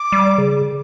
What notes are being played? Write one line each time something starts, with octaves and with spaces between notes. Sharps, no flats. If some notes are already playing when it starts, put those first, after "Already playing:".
Already playing: D6
G3
C#3